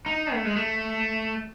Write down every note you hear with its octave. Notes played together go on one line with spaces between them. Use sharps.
D#4
A3
G#3
A3